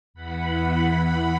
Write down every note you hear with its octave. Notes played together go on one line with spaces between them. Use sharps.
E2 E3 F#5 B5